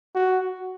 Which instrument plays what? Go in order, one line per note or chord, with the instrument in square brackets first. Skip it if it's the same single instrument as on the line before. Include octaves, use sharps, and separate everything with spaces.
[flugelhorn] F#4